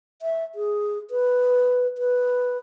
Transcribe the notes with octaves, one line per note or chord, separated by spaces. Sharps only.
E5
G#4
B4
B4